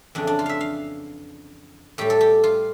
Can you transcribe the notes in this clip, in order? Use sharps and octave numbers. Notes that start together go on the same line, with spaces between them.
F2 C#3 E3 D4
D4
F4
E5 F5
F5
A2 G3 G4
A4
G4
F4